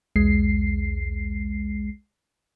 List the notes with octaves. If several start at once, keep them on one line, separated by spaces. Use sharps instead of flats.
B1 E2 G#3 C7